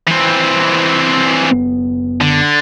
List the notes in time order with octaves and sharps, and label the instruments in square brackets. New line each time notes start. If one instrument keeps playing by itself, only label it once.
[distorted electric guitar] E3 C4
[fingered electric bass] F#1 B3
[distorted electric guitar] D3